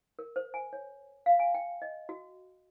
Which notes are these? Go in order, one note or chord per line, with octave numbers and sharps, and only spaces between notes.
A#4
C5
G#5
C#5
F5
G#5
G5
D#5
F#4